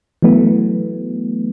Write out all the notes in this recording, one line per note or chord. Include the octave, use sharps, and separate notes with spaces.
E3 F#3 A3 B3